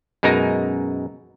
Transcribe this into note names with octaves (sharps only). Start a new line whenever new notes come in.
F#2 B2 G#3 D#4 A#4 A#5